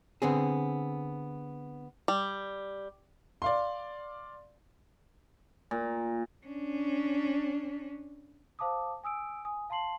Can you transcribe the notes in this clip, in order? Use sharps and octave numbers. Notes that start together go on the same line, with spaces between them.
D3 B3 C4 G#4
G3
D5 F5 C6
A#2
C#4 D4
C5 F5 A5 D6 D#6
G#5 D#6 E6 D7
G#5 D#6
F5 A5 C6 C7 F#7